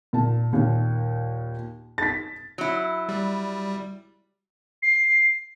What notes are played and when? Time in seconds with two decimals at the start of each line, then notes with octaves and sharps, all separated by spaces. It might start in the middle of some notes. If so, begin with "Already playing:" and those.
0.13 A#2 A5
0.53 D#2 A#2
1.98 A6 B6
2.58 F#3 E4
3.09 G3
4.82 C7